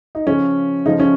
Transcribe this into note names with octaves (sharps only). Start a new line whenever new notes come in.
D#4
C#3 F3 C#4
C#3 F3 D#4
C#4